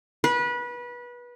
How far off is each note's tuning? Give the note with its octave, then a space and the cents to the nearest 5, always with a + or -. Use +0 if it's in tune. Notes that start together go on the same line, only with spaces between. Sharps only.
B4 -25